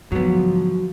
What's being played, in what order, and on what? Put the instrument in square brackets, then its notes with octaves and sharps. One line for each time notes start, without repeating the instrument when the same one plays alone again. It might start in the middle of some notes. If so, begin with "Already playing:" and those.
[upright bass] G#2 D3 [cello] F3 [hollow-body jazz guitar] F#3 B3